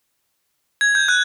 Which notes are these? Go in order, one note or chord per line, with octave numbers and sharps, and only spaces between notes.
G#6
G6
F#6